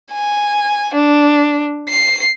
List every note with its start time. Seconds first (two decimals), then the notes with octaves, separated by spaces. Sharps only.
0.12 G#5
0.94 D4
1.89 C7